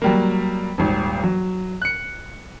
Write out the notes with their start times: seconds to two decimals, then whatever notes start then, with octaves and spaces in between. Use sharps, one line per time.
0.02 F#3 G3 A#3
0.78 D#1 G#1
1.23 F#3
1.82 F#6 C#7